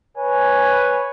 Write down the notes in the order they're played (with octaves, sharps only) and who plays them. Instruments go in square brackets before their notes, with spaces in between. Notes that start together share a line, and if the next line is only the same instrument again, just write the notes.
[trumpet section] B4 C#5 G#5